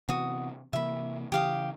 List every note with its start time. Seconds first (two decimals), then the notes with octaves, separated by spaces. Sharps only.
0.09 C3 E3 B3 F#4 D#6
0.73 C3 E3 A#3 E5 B5
1.32 C#3 E3 G4 F5 D#6